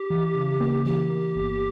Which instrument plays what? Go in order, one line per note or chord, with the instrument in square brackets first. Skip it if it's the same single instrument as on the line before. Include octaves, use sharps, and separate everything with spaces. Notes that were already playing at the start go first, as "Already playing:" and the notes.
Already playing: [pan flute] G4
[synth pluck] E3
C#3
A#3
[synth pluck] E3 [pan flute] G4
[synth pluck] A#3
G1